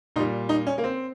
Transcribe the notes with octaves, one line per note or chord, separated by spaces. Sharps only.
A#2 G3 D#4
D#4
C#4
A#3
C4